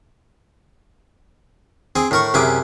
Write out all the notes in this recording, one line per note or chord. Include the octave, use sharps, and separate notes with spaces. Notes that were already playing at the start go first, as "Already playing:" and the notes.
C4 G#4
A2 A#4 C#6
F#2 C3 E4 G#4 D6